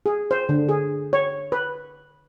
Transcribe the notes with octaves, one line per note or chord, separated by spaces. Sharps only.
G#4
C5
D3
G#4
C#5
B4